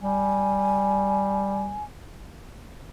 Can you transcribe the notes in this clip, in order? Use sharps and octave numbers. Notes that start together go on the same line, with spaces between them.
G3 G#5